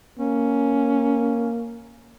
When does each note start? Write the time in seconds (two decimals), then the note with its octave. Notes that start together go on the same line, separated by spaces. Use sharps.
0.19 A#3 C#4